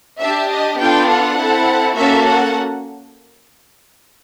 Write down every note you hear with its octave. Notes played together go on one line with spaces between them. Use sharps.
D4 G4 E5
D#5
B3 D4 F4 A4 G5
F#5
C4 E4 A4
A#3 C#4 F#4 A4 E5
F#5